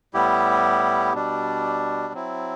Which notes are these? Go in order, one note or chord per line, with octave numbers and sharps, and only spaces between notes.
A2 G3 B3 E4 G4
B2 G3 D4
F#3 C4 E4